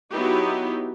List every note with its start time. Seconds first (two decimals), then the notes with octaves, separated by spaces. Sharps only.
0.12 F#3 B3 D#4 E4 G4